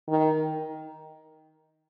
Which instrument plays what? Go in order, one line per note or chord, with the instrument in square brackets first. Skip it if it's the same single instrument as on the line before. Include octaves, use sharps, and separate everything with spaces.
[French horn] D#3